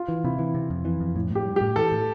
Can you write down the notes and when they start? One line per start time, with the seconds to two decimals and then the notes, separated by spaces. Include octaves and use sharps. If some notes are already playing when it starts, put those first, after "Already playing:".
Already playing: F4
0.08 E3
0.24 C3 E4
0.39 E3
0.55 C3
0.70 F2
0.85 E3
1.01 F2
1.16 A2
1.31 A2 G4
1.46 G3
1.56 A2 G4
1.76 E3 A4
1.92 A2